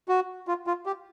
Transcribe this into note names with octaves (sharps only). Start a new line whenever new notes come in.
F#4
F4
F4
G4